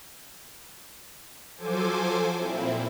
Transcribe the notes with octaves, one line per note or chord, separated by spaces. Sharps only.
F3 F#3 A4 C5 G#5 D6
A#2 C4 E4